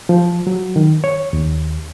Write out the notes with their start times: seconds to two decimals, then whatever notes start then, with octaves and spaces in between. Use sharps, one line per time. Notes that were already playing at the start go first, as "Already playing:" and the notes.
0.09 F3
0.47 F#3
0.76 D#3
1.04 C#5
1.33 D#2